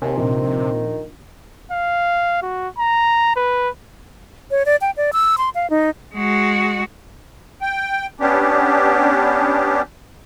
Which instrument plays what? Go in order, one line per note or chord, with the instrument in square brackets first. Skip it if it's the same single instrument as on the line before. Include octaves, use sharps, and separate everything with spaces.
[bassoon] D#2 [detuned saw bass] C3 [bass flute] C4 [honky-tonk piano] G#5
[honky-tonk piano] A#1 [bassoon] D#3
[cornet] F5
F#4
A#5
B4
[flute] C#5
D5
G5
D5
E6
C6
F5
D#4
[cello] G#3 F#4
[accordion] G5
B3 C#4 D4 G4